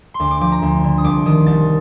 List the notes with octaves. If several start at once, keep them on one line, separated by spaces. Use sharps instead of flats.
C6
D2 D6
D6
F3 D6
A#5
D2
D3
D#6
C2 D6
D#3 D#6
C2 A6